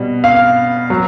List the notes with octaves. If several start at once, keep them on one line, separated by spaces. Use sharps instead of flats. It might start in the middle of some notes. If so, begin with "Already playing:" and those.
Already playing: B2 G3
F5
F#3